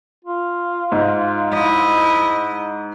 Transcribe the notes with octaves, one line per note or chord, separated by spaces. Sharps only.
F4
G#2
E4 D#5